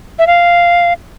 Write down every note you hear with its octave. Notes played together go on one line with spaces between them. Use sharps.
E5
F5